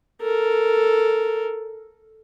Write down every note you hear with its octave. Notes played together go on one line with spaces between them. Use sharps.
A4 A#4